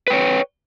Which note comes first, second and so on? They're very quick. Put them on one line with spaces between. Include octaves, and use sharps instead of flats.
B4 G5 C#5